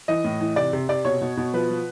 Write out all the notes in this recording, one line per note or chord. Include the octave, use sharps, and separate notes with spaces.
E3 D#5
A2
E3
C3 D5
C3
C3 D5
B2 C#5
B2
B2
F3 B4
F3